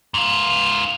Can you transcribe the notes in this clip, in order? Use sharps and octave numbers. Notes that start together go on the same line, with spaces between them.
G#2 F4